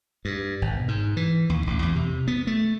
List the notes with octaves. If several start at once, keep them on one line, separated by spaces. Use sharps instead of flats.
G2
G#1
B2
G#2
E3
D#2
A1
E2
C3
B3
A3